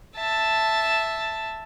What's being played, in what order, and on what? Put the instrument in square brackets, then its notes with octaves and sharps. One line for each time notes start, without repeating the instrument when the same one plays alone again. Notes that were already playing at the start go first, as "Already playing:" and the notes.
[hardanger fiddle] E5 A5